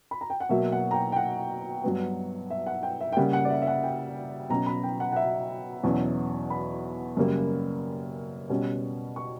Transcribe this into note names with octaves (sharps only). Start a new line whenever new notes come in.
B5
A#5
G5
F#5
B2 F#3 A#3 E5
F#5
A#5
G5
G5
F#5
G2 F#3 B3
E5
F#5
G5
E5
G5
C#3 G3 A#3 F#5
F#5
D5
E5
E5
F#5
G5
B2 F#3 C#4 A#5
B5
G5
F#5
F#5
E5
E2 B2 F#3 C#4
B5
F#2 C#3 G3 A#3
B2 G3 C#4
C#6